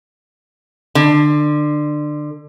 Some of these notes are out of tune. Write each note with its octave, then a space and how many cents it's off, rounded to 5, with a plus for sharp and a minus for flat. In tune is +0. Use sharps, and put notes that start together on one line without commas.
D3 +25